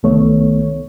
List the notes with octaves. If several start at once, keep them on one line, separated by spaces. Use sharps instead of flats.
C2 D#3 A3 B3 C#5